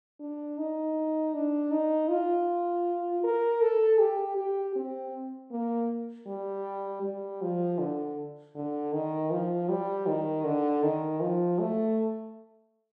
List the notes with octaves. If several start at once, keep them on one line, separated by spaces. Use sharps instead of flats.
D4
D#4
D4
D#4
F4
A#4
A4
G4
G4
C4
A#3
G3
G3
F3
D3
D3
D#3
F3
G3
D#3
D3
D#3
F3
A3